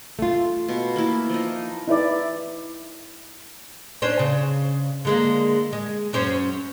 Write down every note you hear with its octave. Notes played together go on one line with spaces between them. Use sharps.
A3 F4
B2
A#3 E4
F3 D#4
D#4 E4 B4 D5
C#4 D4 C5
C#3
D3 G#3 A#3
G#3
F#2 C#4 C5